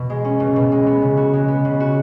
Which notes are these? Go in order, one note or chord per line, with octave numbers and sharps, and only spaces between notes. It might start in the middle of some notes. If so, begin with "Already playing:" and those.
Already playing: B2
G#3
C#4
B2
B2
G#3
B3
C#3
F#4
G#3
B3
C#3
F#4